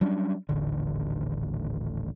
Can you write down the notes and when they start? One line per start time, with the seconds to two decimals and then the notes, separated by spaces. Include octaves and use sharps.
0.01 F#3 G3 C#4 D4
0.49 D#1 A1 D3